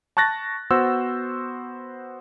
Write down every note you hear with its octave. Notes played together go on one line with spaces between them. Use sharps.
A5 C#6 F#6 A6 A#6
B3 F#4 C5 E6